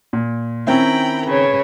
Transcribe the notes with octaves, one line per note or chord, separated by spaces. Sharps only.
A#2
D#3 C4 C#4 E4 G5 A#5 B5
C#3 B4 C#5